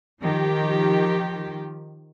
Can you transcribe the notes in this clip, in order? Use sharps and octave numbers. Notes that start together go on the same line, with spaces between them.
D#3 F3 G4